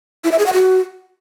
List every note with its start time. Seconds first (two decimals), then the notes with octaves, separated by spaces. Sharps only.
0.24 E4
0.31 E5
0.39 G#4
0.46 F#5
0.53 F#4